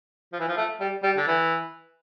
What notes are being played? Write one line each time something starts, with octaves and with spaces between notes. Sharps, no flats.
F3
E3
F3
A3
G3
G3
D3
E3